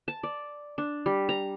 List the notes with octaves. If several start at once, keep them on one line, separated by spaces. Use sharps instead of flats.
A5
D5
D4
G3
A#5